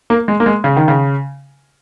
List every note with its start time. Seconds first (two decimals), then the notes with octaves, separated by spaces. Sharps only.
0.10 A#3
0.28 G#3
0.40 A#3
0.46 G#3
0.64 C#3
0.77 D#3
0.88 C#3